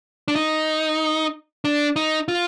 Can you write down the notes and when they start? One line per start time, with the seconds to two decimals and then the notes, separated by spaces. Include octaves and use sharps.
0.28 D4
0.36 D#4
1.65 D4
1.96 D#4
2.28 F4